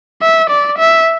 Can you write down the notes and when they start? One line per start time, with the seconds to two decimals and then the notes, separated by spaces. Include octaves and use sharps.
0.22 E5
0.50 D5
0.79 E5